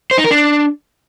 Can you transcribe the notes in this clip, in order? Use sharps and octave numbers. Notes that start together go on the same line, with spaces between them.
C5
D#4
A#4
D4